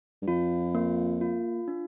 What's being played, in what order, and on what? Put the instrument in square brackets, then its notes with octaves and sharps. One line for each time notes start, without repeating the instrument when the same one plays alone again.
[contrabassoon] G2
[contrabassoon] F2 [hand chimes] F4
[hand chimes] A#3
F4
D4